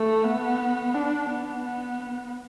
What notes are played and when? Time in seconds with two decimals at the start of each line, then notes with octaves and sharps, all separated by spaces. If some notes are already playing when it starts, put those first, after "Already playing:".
Already playing: A3
0.24 B3
0.94 D4
1.29 B3
1.65 B3